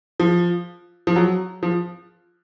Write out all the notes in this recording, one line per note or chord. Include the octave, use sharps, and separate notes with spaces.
F3
F3
F#3
F3